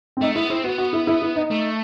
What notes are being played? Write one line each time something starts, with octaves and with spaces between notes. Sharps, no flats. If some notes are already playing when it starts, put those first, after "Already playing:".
C4
A3 D#4
B3 E4
C4 E4
B3 F#4
F#4
E4
E4
E4
D#4
A3